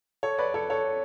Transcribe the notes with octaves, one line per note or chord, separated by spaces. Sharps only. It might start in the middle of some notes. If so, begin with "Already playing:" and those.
A4 C#5
B4 D5
A4 C#5
A4 C#5